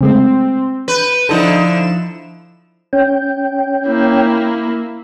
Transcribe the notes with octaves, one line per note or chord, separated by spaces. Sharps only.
C#3 G#3 A3 C4
B4 G6
D3 F3 D#4 E4 A4 E7
C#4 G5
A#3 E4